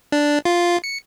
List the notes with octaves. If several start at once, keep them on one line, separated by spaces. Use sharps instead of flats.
D4
F4
C#7